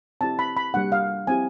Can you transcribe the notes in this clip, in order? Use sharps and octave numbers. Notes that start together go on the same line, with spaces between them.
C4 E4 G4 A5
B5
B5
G3 A#3 D4 F#5
F5
C4 E4 G4 G#5